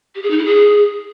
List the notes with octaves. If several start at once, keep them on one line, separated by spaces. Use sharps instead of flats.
G4
G#4
D#4
E4
G#4